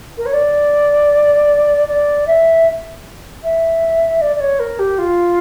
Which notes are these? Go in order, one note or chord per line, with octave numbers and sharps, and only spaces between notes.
A#4
C#5
D5
D5
E5
E5
D5
D5
C#5
A#4
G4
F4